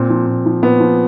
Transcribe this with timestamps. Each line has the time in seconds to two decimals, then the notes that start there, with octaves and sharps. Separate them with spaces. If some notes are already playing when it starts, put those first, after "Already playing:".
Already playing: A#2 C4
0.10 F3
0.27 A#2
0.46 F3
0.62 A#2 B3
0.80 F3